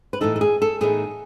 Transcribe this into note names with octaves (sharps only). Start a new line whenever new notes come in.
B4
A2 E3 B3 D#4 A4
A4
G#4
A4
A2 E3 B3 D#4 G#4